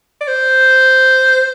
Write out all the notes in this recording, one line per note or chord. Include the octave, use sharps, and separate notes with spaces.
D5
C5